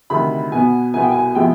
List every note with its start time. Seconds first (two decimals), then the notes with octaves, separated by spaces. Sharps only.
0.10 D2 C3 D#3 B5
0.52 B2 B3 G#5
0.94 C2 B2 B3 G#5
1.03 G5
1.12 G#5
1.35 C3 F3 G#3 B3 G5